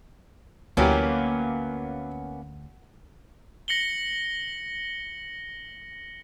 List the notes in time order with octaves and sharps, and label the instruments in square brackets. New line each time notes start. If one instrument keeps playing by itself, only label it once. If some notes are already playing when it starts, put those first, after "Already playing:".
[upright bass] D2 [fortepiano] E3 F#3 G4 [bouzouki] A#3 B3 C#4
[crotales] A#6 C#7 F#7 G7